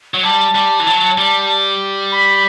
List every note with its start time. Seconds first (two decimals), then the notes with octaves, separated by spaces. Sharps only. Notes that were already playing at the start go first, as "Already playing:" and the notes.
0.14 F#3
0.23 G3 A5
0.55 G3
0.80 E3
0.87 F#3
1.18 G3
2.12 B5